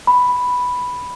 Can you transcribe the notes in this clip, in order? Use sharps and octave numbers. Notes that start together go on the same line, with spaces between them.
B5